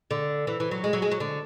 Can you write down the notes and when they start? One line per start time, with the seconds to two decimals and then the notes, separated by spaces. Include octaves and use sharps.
0.11 D3
0.47 E3
0.60 E3
0.71 F#3
0.84 G#3
0.93 F#3
1.02 G#3
1.11 F#3
1.20 D3